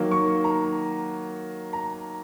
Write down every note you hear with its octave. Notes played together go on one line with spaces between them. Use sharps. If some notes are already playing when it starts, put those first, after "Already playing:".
Already playing: D#3 F#3 A#3
C#6
A#5
A#5